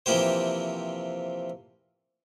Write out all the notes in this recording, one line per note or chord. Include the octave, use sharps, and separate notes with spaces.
C3 E3 F3 A#3 G4 C5